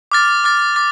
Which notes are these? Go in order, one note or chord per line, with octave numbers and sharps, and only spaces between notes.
D6 F6 A6
D6 F6 A6
D6 A6